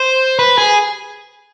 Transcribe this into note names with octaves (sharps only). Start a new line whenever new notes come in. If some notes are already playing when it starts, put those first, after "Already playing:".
Already playing: C5
B4
G#4